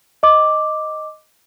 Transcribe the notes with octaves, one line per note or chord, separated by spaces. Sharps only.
D#5 D6